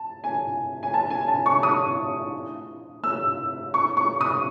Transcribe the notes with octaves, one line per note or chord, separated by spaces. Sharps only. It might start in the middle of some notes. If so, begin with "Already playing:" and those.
Already playing: A5
G#5
G#5
A5
G#5
A5
C#6
D#6
E6
C#6
C#6
D#6